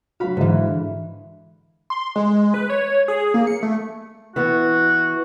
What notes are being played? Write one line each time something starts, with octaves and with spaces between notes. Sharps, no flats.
F#3 F#4 F5 B5
G#2 D3 E3 E4
C6
G#3
B4
C#5
G#4
A#3
C#7
A3
E3 B3 F#4